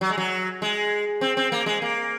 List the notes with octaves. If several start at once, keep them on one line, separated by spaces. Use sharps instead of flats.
F#3
G#3
F#3
G#3
C4
C4
A#3
G#3
A#3